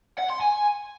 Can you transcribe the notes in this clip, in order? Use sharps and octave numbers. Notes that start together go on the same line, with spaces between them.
F#5
C6
G#5